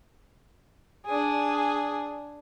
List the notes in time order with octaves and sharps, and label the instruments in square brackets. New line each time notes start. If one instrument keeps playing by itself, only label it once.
[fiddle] D4 G#4